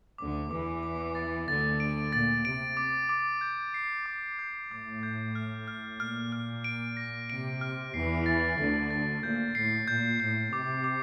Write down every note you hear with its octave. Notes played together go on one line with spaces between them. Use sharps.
D2 D3 D6
E2 E3 D6
D6
A6
D2 D3 A6
D7
A#2 A6
C3 D7
D6
D6
G6
C7
D6
G6
A2 D6
G6
F6
F6
A#2 F6
F6
D7
A#6
C3 D7
F6
E2 E3 C7
A6
D2 D3 A6
A6
A#2 G6
A2 C7
A#2 G6
A2 G6
C3 D6
D6